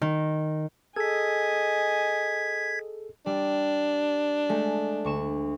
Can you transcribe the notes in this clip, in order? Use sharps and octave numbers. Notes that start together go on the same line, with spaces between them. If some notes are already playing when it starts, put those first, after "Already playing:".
D#3
G#4 A4 D#5 G#5 G#6 B6
G3 D4
G#3 A3
D2 C#6 E7